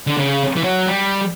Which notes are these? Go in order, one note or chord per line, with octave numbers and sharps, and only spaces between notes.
D3
C#3
E3
F#3
G3